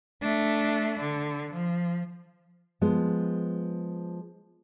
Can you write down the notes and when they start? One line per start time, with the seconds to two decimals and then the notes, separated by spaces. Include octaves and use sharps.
0.22 A3 D4
0.99 D3
1.53 F3
2.81 F3 G#3 B3